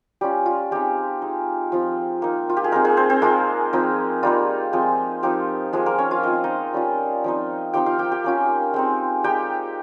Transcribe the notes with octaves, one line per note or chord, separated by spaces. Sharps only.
G3 C#4 F4 G4
F4
G#3 C4 D#4 G4
G#3 D#4
F3 C4 F4
A#3 D#4
F4
G4
G#4
G#3 A#3 C4 D#4 A#4
G#3 G#4
C4 C5
C4 C5
G#3 A#3 F4 G#4
F3 C4 D#4
G3 A#3 D#4 F4
F3 G#3 C4
F3 C4 D#4 G4
F3 G#3 A#3 D#4 G#4
A#3 A#4
C#4 C#5
F4 F5
G#3 C4 F4 D#5
F5
D#4 D#5
G3 C#4 F4
F3 C4 D#4
F3 C4 D#4 G4 G5
F4 F5
G4 G5
G4 G5
A#3 C#4 F4
G#3 C4 D#4
G#3 D#4 G4 G5